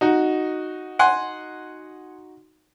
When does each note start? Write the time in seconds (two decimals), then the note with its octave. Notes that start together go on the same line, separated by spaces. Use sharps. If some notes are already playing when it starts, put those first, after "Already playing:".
0.01 D#4 F#4
0.99 F#5 G#5 C6